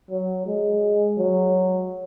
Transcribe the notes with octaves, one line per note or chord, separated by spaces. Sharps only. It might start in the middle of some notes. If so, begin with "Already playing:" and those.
F#3
G#3
F#3